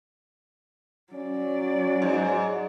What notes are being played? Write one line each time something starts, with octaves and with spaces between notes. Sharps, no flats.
F#3 C#4 D5
G#2